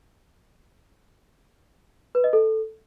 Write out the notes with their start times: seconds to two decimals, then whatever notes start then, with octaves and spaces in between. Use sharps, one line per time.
2.15 B4
2.24 D#5
2.33 A4